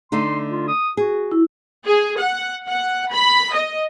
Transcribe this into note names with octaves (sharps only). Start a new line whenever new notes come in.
D3 A3 D#4 C6
F4
D#6
F#4 G#4
E4
G#4
F#5
F#5
B5
D#5